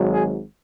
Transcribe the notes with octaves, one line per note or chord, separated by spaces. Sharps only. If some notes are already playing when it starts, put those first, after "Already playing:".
Already playing: G#1 G#2 F#3
G#4